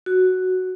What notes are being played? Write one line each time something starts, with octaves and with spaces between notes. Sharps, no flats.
F#4